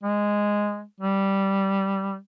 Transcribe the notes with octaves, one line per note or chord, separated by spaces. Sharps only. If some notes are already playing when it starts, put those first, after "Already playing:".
G#3
G3